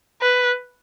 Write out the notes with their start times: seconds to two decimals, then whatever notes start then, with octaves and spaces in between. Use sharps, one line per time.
0.22 B4